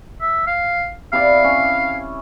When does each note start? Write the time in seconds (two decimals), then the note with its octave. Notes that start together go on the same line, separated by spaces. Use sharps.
0.21 E5
0.47 F5
1.13 C3 E4 D5 F5
1.44 C#4